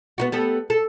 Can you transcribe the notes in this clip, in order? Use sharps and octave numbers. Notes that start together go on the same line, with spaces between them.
B3 D#4 F#4
G3 B3 A4
A4